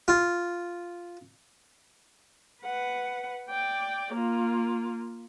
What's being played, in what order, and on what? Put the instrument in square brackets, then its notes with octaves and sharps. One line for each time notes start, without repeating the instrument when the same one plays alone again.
[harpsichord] F4
[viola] B4 F#5
D5 G5
A#3 F4